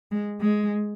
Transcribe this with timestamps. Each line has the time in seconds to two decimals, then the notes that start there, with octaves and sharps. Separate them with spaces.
0.11 G#3
0.41 G#3